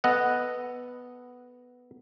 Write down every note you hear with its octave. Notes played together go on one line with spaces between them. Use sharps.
B3 A4 D#5 F#5